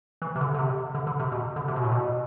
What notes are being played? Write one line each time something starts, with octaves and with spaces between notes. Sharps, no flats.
E3
C3
D3
D3
C3
D3
D3
C3
B2
D3
C3
B2
A2
B2